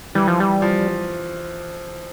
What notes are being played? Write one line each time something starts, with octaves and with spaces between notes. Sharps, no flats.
E3 G3
F3
G3
F3